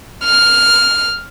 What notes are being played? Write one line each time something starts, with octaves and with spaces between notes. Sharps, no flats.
F6